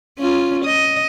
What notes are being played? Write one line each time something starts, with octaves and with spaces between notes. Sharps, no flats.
C#4 F4
D#5